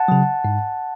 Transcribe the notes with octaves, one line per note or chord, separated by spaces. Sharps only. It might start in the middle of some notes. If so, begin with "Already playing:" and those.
Already playing: F#5 A5
C#3 F#3
G#2